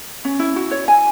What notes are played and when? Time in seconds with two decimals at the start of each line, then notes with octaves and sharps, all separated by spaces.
0.25 C#4
0.39 E4
0.56 F#4
0.71 C#5
0.88 G#5